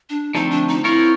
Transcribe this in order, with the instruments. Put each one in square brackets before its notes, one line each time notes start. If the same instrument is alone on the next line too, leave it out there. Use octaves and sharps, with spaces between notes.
[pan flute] D4
[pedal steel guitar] D3 F3 A3 C4 [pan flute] D#4
[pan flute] D4
D#4
[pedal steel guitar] C4 F4 A#4 C#5 [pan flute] E4